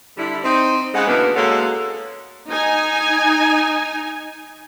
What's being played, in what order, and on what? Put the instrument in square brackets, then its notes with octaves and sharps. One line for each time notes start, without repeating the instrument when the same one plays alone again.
[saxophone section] D3 G3 E4
C4 D#4
C#3 G#3 F#5
B2 D3 E3 A#3 B3
G#3 A#3 C#4 F#4 A4 F#5
[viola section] D#4 G#5